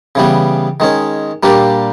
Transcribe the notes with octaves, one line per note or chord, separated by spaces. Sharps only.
C#3 E3 G3 B3
D#3 G#3 C#4
A#2 G3 A#3 D4 G4